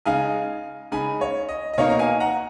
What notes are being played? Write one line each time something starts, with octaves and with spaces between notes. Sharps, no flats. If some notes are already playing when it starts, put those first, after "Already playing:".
C#3 G#3 D#4 F5 G#5
C#3 G#3 D#4 G#5 B5
C#5
D#5
D#5
B2 A#3 D#4 C#5 F5
A#5
F5 G#5
F#5 A#5